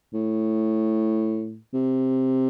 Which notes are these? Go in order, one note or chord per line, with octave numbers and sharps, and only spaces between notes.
A2
C3